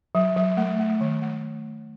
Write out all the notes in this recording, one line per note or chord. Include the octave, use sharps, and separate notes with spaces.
F#3
F#3
A3
A3
D#3
A3